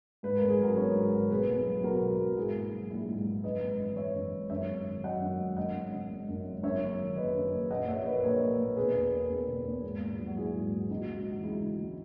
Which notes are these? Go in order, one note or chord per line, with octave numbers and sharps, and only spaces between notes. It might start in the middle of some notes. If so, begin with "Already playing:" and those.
G#2 B4
G#1 A#4
G#4
F#3 F#4 A#4
B3 A#4 C#5
G#2
G#1
B2 G#4 B4
B1
F#3
B1 F#4 A#4
B2
B1
G#2 E4 G#4
A#1
F#3
A#1 E4
G#2
A#1
F#2 B4 D#5
G#1
E3
G#1 C#5 E5
F#2
G#1
F#2 C#5 E5
G#1
D#3
F#3 D#5 F#5
F#2
G#1
F#2 D#5 F#5
G#1
C#3
G#1
F#2
G#1
F#2 C#5 E5
F#1
D#3
F#1 B4 D#5
F#2
F#1
A#2 D#5 F#5
A#1 C#5 E5
A#3 B4 D#5
A#1 A#4 C#5
A#2
A#1
B2 G#4 B4
E2
A#3
E2
B2
E2
G#2
A#1
F#3
F#4
A#1 E4 G#4
G#2
A#1
C#3 D#4 F#4
C#2
E3
F#4
C#2 E4
C#3
C#2